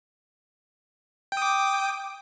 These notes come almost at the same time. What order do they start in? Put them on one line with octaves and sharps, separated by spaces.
G5 D#6 D6